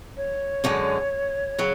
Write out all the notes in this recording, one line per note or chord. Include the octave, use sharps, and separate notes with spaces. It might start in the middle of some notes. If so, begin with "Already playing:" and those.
C#5
F#2 D3 G#3
C#3 F#3